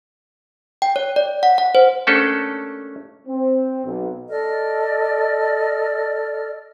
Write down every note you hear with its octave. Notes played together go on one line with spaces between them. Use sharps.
G5
C#5
D5
F#5
F#5
C5
A3 A#3 C#4 D4 G4 A4
C4
B1
A4 D5 D#5 F6